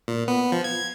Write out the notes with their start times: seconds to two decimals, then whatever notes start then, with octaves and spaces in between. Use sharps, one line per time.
0.08 A#2
0.28 B3
0.52 F3
0.64 G#6